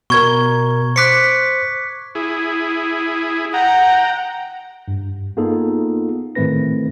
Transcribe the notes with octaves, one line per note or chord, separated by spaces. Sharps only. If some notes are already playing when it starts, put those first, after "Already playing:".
B2 A#4 C#6 G#6 G7
C5 D6 F#6 B6 C#7
E4 G#4
F#5 G5 A#5
G2
A#3 B3 D#4 F4 G#4 A4
A2 D#3 A3 C4 B4 A#6